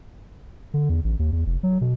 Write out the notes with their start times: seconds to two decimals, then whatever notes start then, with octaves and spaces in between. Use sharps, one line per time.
0.74 D3
0.89 E2
1.04 A1
1.19 D#2
1.33 E2
1.47 F1
1.63 F#3
1.81 B2